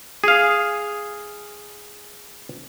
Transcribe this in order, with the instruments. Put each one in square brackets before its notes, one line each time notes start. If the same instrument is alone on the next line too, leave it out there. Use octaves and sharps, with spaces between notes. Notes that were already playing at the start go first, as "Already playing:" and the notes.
[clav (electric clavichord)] G#4 F5